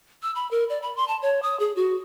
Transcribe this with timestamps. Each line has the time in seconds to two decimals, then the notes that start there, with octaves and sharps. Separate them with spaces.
0.23 E6
0.35 B5
0.51 A#4
0.70 D5
0.82 B5
0.96 C6
1.08 A5
1.22 C#5
1.42 D#6
1.60 G#4
1.76 F#4